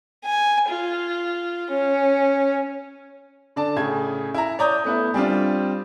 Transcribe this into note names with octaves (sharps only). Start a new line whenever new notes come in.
G#5
F4
C#4
D3 D5 A5
A2 C#3 G#4 G#6
E4 A#5
C#5 D5 A#5 D#6 G6
A3 B3 E4
G3 C4 D4 F4